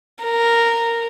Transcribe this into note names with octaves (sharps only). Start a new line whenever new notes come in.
A#4